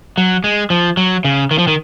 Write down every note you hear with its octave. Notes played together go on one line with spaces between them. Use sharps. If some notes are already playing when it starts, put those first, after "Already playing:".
F#3
G#3
F3
F#3
C#3
D#3
F3
D#3